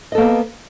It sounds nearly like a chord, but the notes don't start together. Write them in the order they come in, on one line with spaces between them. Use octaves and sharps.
D#5 A4 A#3 B3